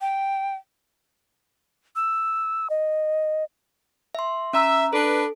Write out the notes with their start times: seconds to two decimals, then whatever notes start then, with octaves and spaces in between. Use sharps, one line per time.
0.01 G5
1.96 E6
2.70 D#5
4.15 E5 C6
4.53 C#4 E5 A#5
4.93 D4 A4 B4